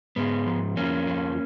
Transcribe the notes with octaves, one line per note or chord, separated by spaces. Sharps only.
G#2 G#3 B3
F3
F2 A#3 C#4
F3